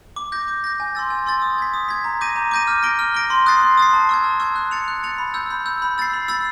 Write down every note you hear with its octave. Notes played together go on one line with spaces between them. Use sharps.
D6
G6 A#6
D6
G6 A#6
G#5
C6 E6 A6
G#5
C6 E6 A6
D#6
G#6 B6
D#6
G#6 B6
A#5
D6 G6 A#6 D#7
A#5
D6 G6 A#6 D#7
F6
A#6 D7 G7
F6
A#6 D7 G7
C6
D#6 F#6 A6 C7
C6
D#6 F#6 A6 C7
A5
C#6 E6 G#6
A5
C#6 E6 G#6
F#6
A6 C#7 F7
F#6
A6 C#7 F7
B5
E6 G6
B5
E6 G6
B5
E6 A6 C7
B5
E6 A6 C7